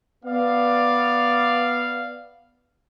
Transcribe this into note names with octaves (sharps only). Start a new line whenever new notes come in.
B3 D5 F5